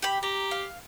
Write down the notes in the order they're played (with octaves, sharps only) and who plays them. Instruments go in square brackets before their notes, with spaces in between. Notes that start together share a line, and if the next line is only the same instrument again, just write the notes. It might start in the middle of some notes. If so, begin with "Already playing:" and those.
[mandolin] G4 B5
[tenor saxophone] G4 [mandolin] A#5
[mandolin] F5